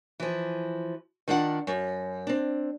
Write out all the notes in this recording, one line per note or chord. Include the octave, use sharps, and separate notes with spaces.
E3 F3
D#3 D4 F4 F#5
F#2
C4 D4